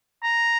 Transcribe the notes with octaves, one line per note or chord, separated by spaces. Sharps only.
A#5